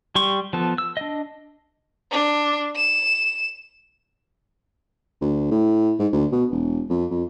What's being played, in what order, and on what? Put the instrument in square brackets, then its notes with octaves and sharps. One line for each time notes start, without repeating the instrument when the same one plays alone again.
[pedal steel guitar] G3 G4 C6 C#6
F3 B3 A4
E6
D4 D#5
[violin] D4
E7
[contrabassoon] D2
A2
G#2
D2
B2
E1
F2
F2